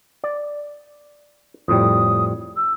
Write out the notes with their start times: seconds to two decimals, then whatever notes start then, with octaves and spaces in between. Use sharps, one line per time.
0.24 D5
1.68 F2 A2 G3 D#6
2.56 E6